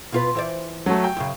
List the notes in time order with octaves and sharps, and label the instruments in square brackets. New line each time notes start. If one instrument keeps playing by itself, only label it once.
[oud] B2 F4 B4
E3 C5 D5
[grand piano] F#3 A3
G5
[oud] F#2 C#3